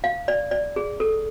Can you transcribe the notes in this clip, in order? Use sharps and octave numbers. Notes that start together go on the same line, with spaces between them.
F5
D5
D5
G#4
A4